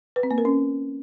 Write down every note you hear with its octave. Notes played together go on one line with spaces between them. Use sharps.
B4
C4
A#3
A#4
C#4